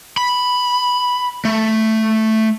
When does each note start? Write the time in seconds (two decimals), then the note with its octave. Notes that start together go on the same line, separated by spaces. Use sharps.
0.17 B5
1.45 A3